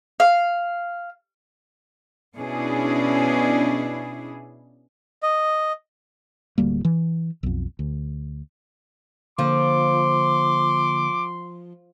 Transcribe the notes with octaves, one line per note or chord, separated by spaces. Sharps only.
F5
B2 C#4 D4 E4 G#4
D#5
D1 D2 G3 A#3
E3
B1 F2
D2
D3 F3 A#3 C6 D6